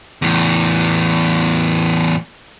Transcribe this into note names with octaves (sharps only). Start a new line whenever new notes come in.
E2 A2